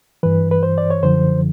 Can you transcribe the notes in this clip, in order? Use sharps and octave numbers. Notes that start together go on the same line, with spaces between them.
G2 E3 B4
B4
C5
D5
C#5
F#2 D3 F3 C5